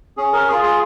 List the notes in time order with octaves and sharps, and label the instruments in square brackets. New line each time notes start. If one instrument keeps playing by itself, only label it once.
[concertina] C#4 G#4
A#4
F4 G#4
G#4